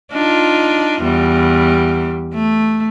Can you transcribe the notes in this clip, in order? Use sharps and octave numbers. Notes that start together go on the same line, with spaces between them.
D4 D#4 F4
E2 G3
A3